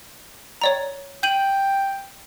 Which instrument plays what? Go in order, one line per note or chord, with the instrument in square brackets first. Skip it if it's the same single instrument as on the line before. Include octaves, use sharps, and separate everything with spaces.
[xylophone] C#5 D5 A#5
[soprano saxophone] G5 [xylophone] G6 D#7 F#7